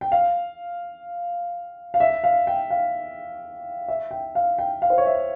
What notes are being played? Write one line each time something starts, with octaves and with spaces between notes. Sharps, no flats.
G5
F5
F5
E5
F5
G5
F5
E5
G5
F5
G5
F5
C5
C#5
E5